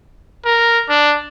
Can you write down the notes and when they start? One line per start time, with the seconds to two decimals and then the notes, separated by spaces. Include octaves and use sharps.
0.45 A#4
0.89 D4